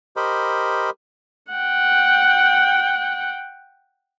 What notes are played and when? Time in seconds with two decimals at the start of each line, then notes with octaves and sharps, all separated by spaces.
0.16 G4 A#4 C5 D#5 B5
1.52 F#5 G5